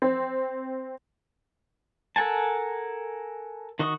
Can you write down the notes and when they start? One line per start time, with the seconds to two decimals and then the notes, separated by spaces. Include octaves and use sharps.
0.02 C4
2.16 A4 A#4 F#5 G#5 A5
3.79 D#3 F#4 D#5 C#6 D#6